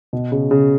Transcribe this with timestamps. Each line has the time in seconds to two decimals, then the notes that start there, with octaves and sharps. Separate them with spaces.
0.13 B2
0.32 C#3
0.51 C#3